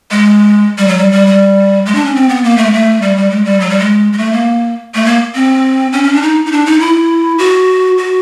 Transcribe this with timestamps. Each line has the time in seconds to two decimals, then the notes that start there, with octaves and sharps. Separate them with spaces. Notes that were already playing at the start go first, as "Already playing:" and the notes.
0.11 G#3
0.78 G3
0.88 F#3
0.98 G3
1.12 G3
1.27 G3
1.86 G#3
1.95 D4
2.05 C#4
2.15 C4
2.29 B3
2.44 A#3
2.58 A3
2.66 G#3
2.73 A3
3.02 G3
3.17 G3
3.31 G#3
3.45 G3
3.60 F#3
3.70 G3
3.79 G#3
4.13 G#3
4.18 A3
4.33 A#3
4.95 A3
5.05 A#3
5.35 C4
5.93 C#4
6.03 C#4
6.13 D4
6.22 D#4
6.46 D#4
6.52 D4
6.66 D#4
6.80 E4
7.38 F#4
7.98 F#4